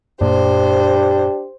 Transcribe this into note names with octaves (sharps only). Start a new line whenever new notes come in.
F#2 A#2 A#3 D4 G4 C5